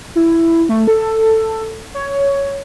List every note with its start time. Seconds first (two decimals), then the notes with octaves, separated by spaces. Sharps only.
0.16 E4
0.69 A3
0.87 A4
1.94 C#5